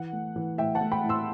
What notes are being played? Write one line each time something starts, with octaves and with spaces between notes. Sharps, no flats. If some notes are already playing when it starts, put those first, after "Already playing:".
Already playing: E3 F#5
A3
E3
A2 E5 G5
F#5 A5
A3
G5 B5
A2
C6 E6